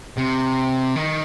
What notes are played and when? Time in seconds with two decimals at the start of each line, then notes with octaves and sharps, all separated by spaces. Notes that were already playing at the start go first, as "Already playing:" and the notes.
0.17 C3
0.96 D#3